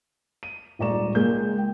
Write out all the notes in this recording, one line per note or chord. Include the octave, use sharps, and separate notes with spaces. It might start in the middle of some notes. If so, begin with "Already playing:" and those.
D#7
D#1 G#2 D5 A#5 C#6 E7
C#2 A#2 G#3 F4 A#4 G6
G5